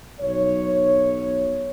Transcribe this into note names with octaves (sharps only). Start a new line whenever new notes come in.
B1 C#5